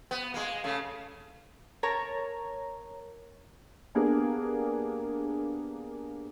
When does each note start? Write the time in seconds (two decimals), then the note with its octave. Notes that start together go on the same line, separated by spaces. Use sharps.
0.11 B3
0.34 G#3 A#3
0.64 C#3 A3
1.83 A#4 C#5 A5 A#5
3.95 A#3 B3 D4 G4 G#4 A#4